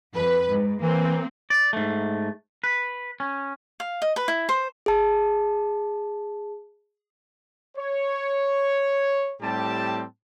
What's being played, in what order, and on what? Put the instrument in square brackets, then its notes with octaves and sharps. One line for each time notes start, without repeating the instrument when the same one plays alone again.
[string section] F2 B4
G#2
[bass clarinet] E3 [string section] A#3 C4
[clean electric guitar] D5
G#2 A3
B4
C#4
[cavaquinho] F5
D#5
B4
E4
C5
[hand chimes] G#4 A5
[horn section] C#5
A2 G3 C4 G4 A5